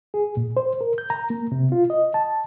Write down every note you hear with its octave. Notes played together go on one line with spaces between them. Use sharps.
G#4
A#2
C5
A#4
G6
A#5
A#3
C3
F4
D#5
A5